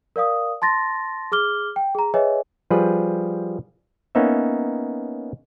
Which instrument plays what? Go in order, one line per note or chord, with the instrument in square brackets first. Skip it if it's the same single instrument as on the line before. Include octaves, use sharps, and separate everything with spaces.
[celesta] A#4 D5 F5 D#6
A5 C6 A6 A#6
G#4 D6 F6 G7
G5
G#4 A#5
G#4 B4 C#5 D#5 E5 G#5
[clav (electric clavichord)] F3 G3 G#4 B4
A#3 B3 C#4 D#4 C#5 E5